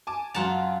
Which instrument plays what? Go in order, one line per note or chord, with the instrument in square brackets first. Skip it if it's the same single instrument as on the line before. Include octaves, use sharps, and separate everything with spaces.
[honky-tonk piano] G#5 A5 D6
[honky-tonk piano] F#2 A#5 F7 [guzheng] F4 F#5 A5